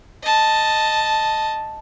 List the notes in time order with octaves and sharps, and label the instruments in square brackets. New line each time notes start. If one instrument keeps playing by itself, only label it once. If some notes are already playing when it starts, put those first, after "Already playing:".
[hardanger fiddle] D#5 A5